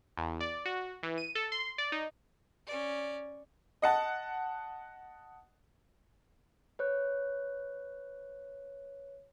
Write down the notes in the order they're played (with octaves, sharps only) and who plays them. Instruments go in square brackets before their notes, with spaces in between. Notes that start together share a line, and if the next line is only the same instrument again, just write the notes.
[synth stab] E2
D5
F#4
E3
D#7
A4
C6
D5
D#4
[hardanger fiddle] C#4 D5
[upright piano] D#5 F#5 A5
[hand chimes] B4 C#5 F#6